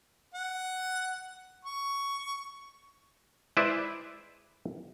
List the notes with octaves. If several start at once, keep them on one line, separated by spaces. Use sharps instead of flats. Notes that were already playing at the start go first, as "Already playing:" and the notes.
F#5
C#6
G#3 E4 B4 C5 D5 E5